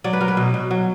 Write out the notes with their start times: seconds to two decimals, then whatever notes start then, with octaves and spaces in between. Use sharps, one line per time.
0.04 F#3 D5
0.13 B4
0.21 F#3 A#4
0.28 B4
0.37 B2
0.54 B2
0.71 F#3